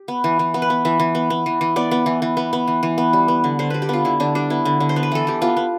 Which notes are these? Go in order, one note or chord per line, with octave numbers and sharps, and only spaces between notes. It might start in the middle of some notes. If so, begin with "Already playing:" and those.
Already playing: G4
B3
E3
E3
B3
B4
B3
E3 E5
E3
B3
B3
E3
E3
B3 D5
B3
E3
E3
B3
B3
E3
E3
B3
G3
B3
D3
D3 C5
G3 B4
G4
B3 F4
D3 E4
D3 D4
G3 D4
B3 E4
D3
D3
C5
B3
B4
E3 A4
E3 G4
B3 F4
B3